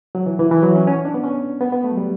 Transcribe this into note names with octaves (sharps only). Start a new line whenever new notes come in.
F#3
E3
E3
E3
F#3
C#4
C#4
D4
B3
C#4
B3
B3
A3
F#3
G3